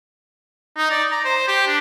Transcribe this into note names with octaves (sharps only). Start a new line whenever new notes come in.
D#4
D5
A#5
C5
G4
D4